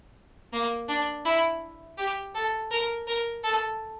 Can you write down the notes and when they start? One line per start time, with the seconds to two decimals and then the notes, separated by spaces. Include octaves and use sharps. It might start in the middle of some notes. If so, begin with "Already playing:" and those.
0.53 A#3
0.89 D4
1.25 E4
1.98 G4
2.35 A4
2.71 A#4
3.08 A#4
3.44 A4